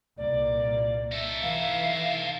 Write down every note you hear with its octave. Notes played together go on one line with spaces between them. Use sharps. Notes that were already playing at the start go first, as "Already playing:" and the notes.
C2 A#2 A#3 D5
D#4 A4 E5
E3 F5